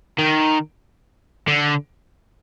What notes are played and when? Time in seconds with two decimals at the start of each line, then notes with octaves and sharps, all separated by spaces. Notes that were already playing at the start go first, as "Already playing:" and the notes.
0.19 D#3
1.48 D3